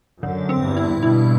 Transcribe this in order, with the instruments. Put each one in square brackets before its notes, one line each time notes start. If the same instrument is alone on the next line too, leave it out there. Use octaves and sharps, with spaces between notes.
[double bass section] F#2 [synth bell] D3
[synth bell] C4
[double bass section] E2 G2
[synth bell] E4
[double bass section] G2 B2 [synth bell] E4